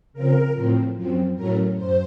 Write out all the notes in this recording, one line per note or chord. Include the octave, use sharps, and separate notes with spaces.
C#3 F3 C4 A#4
A2 F3 C4
F#2 F3 C4
A2 F#3 A3 C#4 A#4
F#2 C5